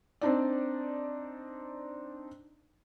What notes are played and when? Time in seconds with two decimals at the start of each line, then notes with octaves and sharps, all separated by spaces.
0.21 C4 D4 D#4 D5